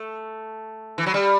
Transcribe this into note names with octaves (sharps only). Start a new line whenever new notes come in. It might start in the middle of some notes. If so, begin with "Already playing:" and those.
Already playing: A3
E3
F#3
G3